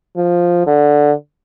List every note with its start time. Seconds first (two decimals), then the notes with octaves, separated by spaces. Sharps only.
0.17 F3
0.67 D3